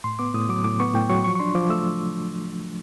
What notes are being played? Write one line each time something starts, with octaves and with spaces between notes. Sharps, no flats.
A2 C6
B3 D6
A2 D#6
F#3 D6
A2 D6
B3 C#6
A2 G5
F#3 C#6
F3 C#6
C#6
D4 C6
F3 D6
A3 E6